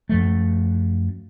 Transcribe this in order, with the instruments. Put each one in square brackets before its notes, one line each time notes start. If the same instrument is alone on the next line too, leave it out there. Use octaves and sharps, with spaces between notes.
[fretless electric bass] F#2 F3 A3